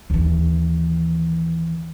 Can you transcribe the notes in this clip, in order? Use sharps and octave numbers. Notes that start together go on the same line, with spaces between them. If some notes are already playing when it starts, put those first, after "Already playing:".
D#2 E3